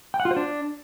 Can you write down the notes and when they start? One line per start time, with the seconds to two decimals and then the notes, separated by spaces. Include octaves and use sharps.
0.14 G5
0.20 F#5
0.25 F4
0.31 C5
0.36 D4